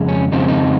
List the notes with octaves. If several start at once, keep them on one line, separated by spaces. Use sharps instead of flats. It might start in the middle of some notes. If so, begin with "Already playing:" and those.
Already playing: F2 C#3 G#3
C#4
F2 C#3 G#3 C4 D#4
C#4
D#4